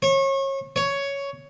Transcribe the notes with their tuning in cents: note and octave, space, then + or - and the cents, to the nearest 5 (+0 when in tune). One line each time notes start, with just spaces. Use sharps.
C#5 -30
C#5 +10